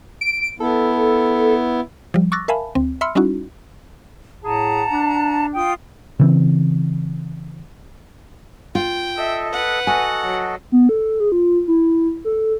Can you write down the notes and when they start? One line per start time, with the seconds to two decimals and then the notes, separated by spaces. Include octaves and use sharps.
0.21 D7
0.60 B3 E4 A4
2.14 F3 G3
2.32 C#6 D6 E6 F#6 A6 A#6
2.48 A#4 E5 F5 G#5 A5 B5
2.75 D2 C4
3.01 E5 B5 C6 E6 F6 C#7
3.15 G3 C#4 D#4 E4 F#4
4.44 A2 G#4 F#5 A5 A#5
4.90 D4
5.54 F4 G5 D#6
6.19 C#3 E3 C4
8.75 F4 G5
9.17 A4 D#5 E5
9.53 B4 F#5
9.87 F#4 A4 D#5 G#5
10.25 F#3
10.72 B3
10.89 A4
11.20 G#4
11.32 F4
11.68 E4
12.25 A4